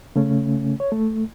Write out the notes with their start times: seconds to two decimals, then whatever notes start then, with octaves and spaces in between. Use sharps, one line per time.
0.16 C#3 A3 C#4
0.80 C#5
0.92 A3